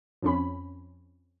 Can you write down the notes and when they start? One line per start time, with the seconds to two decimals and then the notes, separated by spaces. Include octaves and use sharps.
0.23 F2 C#4 B5